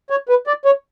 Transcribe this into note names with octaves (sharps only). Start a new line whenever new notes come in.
C#5
B4
D5
C#5